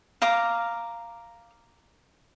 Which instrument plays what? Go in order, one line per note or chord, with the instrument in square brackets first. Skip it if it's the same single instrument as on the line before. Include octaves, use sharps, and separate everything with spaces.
[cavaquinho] F5 A#5 D6